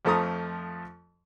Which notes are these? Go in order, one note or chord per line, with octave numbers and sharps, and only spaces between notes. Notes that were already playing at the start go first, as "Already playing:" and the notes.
F2 F3 A3 A#5 D#6